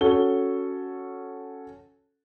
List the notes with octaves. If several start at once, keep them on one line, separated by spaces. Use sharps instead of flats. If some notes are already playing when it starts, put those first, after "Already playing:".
C#4 F#4 A4 G7